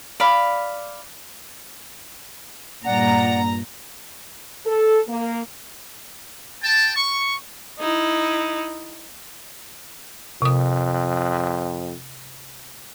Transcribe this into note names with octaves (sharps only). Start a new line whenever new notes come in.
D5 F5 B5
G2 A#2 D5 F#5 A#5
A4
A#3
G5 A5
C#6
D#4 E4
F2 C3 D#6